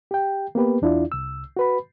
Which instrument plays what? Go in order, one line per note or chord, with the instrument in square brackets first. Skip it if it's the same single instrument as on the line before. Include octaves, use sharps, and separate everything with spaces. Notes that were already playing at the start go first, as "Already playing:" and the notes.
[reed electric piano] G4 G5
A#3 B3 G4 B4
E2 D4 E4 F4 D5
C2 E6
F#4 B4 B5